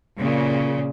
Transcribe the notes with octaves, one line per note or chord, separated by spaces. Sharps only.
A#2 C#3